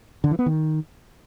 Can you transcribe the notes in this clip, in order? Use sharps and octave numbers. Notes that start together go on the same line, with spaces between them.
D3
E3
B3
D#3